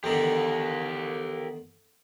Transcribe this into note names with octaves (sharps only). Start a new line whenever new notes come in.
E2 D3 D#3 G4 A#4